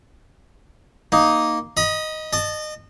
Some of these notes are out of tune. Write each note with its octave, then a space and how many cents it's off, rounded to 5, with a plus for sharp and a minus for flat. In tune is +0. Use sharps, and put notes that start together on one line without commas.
A#3 +0 D#4 +0
D#5 +0 B5 -45
D#5 -30 A5 +0